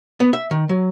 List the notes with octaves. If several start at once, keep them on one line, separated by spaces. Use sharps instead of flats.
B3
E5
D#3
F#3